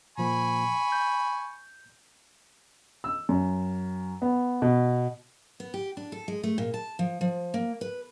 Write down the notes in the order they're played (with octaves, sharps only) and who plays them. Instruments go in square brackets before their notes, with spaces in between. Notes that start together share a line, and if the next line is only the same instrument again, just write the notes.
[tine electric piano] A#2 F3 A#3 [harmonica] G#5 B5 C#6
[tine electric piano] G6
[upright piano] E6
F#2
B3
B2
[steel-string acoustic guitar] B3
G4
D4
A4
G#3
A3
A#2
A5
F3
F3
A#3
B4